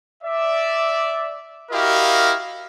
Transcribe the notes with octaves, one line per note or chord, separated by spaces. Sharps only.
D5 E5
E4 F#4 G4 A#4 D#5 F5